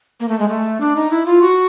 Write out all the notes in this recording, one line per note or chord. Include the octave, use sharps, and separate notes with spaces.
A#3
A3
G#3
A3
D4
D#4
E4
F4
F#4